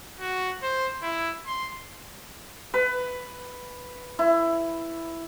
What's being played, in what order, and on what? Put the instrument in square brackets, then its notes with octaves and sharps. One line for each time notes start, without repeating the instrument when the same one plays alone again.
[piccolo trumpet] F#4
C5
E4
C6
[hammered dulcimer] B4
E4